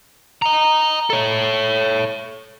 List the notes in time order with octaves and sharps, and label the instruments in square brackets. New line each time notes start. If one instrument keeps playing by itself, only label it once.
[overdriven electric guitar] D#5 A#5
A4 C#5